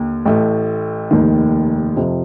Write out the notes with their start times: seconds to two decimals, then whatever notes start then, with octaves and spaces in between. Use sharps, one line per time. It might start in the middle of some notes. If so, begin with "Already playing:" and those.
Already playing: D#2 D3
0.25 A1 A2 A3
1.11 F1 D#2 D#3
1.96 F2 C3 F3